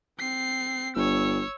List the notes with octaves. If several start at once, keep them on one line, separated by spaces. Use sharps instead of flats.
C4 C7
G1 C#5 E6